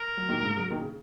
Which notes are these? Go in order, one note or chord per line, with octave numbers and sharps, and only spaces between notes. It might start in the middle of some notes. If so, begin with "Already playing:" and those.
Already playing: A#4
F#3
A#2 D#3
G#2 C#3
C#3 F#3
A#2 D#3
C#3